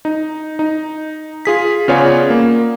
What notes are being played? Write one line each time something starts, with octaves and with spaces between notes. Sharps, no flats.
D#4
D#4
F4 G#4 B6
C#3 B3 F4 C#5 D5 G#5
A#3